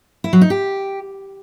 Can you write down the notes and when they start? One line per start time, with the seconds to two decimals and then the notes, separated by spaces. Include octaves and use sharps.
0.24 E4
0.33 F#3
0.41 D#4
0.50 G4